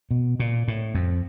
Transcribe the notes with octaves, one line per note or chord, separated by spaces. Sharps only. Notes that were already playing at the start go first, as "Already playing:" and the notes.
B2
A#2
A2
F2